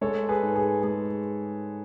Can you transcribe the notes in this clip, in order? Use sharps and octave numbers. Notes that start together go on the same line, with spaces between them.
G#3 A4 C#5
G#4 B4
G#2
G#4
G#3 G#4